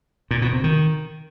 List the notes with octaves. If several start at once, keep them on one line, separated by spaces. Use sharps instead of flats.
A#2
B2
C3
D#3